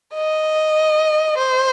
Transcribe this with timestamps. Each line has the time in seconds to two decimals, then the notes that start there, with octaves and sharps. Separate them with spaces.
0.14 D#5
1.38 C5